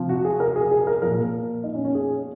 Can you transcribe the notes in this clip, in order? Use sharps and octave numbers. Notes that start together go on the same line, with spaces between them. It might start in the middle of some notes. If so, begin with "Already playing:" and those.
Already playing: C3 F3
F#4
G#4
A#4
G#4
G#4
A#4
A#2 F3 A#4
D#4
C#4
C#4
G#4